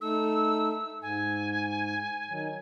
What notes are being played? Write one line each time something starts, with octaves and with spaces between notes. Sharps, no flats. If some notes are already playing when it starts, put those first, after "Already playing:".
A3 D#4 A4 E6
G#2 G#5
D#3 F#3